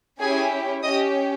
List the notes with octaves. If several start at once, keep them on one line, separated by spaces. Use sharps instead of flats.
C#4 E4 G4 G#4 G#5
C#4 G4 D#5 D#6